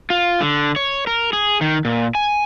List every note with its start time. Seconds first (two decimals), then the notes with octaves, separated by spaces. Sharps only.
0.10 F4
0.41 D3
0.76 C#5
1.07 A#4
1.33 G#4
1.61 D#3
1.85 A#2
2.15 G#5